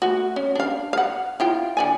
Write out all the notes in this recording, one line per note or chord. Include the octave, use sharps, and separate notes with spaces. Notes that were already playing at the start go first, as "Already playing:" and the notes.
A3 F#4
C#4
D4 F5
F5 F#5
E4 F4 G5
D3 D5 G#5